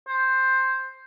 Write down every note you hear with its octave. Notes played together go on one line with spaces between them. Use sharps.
C5